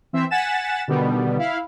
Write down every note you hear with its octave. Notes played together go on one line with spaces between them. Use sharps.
E3 C4 C5 E5
F#5 G#5 A6 B6 E7
B2 D3 D#3 G3 B3
E4 F5 B5